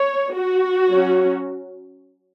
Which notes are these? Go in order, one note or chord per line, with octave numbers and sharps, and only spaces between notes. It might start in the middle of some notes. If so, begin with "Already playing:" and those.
Already playing: C#5
F#4
F#3 C#4